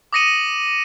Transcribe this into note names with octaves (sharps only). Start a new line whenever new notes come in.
D6 D#6 A#6 C#7 D#7 F#7